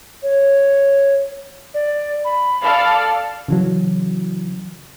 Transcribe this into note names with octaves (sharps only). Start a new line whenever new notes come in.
C#5
D5
B5
A4 D5 F5
C#3 E3 F#3